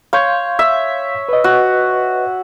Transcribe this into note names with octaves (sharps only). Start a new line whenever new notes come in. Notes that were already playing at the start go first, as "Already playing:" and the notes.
C#5 F5 C6 G6
E5
B4 D#5
F#4